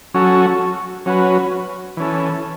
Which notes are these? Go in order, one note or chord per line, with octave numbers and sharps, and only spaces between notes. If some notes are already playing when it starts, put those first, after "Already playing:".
F#3 C#4 F#4 A4
F#3 C#4 F#4 B4
E3 C#4 A4